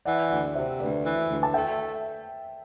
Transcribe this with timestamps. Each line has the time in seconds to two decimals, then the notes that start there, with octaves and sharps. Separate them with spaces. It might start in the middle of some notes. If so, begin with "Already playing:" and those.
0.05 E3 D5 F#5
0.30 D2 D5 F#5
0.55 C3 C5 E5
0.80 D2 B4 D5
1.04 E3
1.29 D2 B4
1.43 A5
1.54 A3 E5 G5